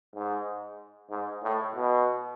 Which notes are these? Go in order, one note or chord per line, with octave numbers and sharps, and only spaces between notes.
G#2
G#2
A2
B2